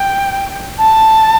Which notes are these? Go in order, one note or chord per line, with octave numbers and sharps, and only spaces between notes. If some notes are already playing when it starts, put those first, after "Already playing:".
Already playing: G5
A5